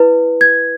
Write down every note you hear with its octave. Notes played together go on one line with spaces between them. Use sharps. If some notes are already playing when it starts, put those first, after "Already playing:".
Already playing: E4 B4
G#6